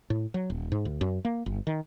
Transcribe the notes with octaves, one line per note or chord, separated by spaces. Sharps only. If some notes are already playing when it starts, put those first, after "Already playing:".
A2
F#3
D#1
G#2
D2
F#2
A#3
G1
D#3